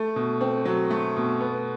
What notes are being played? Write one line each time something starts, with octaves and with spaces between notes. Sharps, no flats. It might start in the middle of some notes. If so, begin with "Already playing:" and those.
Already playing: A3 A4
B2
C4
F#3
A3
B2
B3